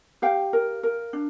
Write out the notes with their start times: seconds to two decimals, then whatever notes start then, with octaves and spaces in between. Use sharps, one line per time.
0.22 G4 F5 G5
0.53 A#4
0.83 A#4
1.13 D4